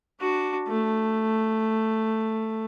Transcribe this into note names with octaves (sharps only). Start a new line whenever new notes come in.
D4 F#4
A3